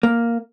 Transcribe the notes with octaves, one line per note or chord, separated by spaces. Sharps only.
A#3